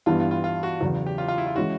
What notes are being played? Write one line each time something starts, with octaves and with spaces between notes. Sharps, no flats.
G2 E3 G3 B3 F4
F4
F4
F4
F#4
E2 C#3 F#3
G4
F4
F4
E4
F4
E3 G#3 C#4 E4 F#4